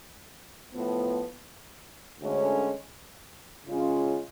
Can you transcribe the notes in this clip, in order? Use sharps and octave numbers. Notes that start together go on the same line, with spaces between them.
A2 F3 B3
D2 D3 G#3 C#4
C#3 G#3 C#4 F4